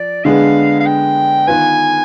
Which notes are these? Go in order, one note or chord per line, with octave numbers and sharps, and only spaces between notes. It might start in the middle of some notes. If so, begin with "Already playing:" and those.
Already playing: F3 D5
D3 G#3 B3 D4 G#4 F5
F5
G5
D#3 B3 F4 B4 G#5